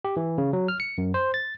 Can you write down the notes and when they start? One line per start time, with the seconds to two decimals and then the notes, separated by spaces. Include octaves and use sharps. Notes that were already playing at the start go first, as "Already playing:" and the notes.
0.05 G4
0.17 E3
0.38 C#3
0.53 F#3
0.68 F6
0.80 C#7
0.98 F#2
1.14 C5
1.34 A6